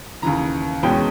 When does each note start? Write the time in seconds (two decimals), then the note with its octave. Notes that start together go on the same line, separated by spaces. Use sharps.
0.22 D#2 C#3 E3 A#5
0.83 E2 B2 G#3 C#4 G5